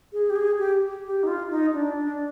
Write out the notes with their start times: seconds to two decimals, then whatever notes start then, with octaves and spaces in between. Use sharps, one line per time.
0.13 G#4
0.30 G4
0.36 G#4
0.59 G4
1.05 G4
1.23 D#4
1.27 F4
1.51 D#4
1.74 D4
1.96 D4